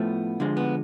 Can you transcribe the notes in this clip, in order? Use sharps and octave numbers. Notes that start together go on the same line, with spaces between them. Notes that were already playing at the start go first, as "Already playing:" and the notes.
Already playing: A2 F3 A3 B3
D3 F3 G#3
B3